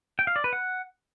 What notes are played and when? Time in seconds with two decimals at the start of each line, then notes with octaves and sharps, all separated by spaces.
0.19 G5
0.27 F5
0.36 D5
0.44 B4
0.53 F#5